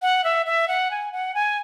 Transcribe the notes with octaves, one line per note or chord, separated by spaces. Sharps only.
F#5
E5
E5
F#5
G#5
F#5
G#5